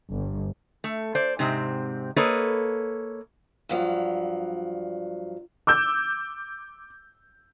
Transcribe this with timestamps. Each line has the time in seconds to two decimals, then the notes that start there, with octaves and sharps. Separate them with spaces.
0.13 G1
0.84 A3
1.15 C5 D5
1.39 G#2 C3 C4
2.16 A#3 A4 B4 C#5 D#5
3.69 G2 F3 F#3
5.67 D6 E6 G6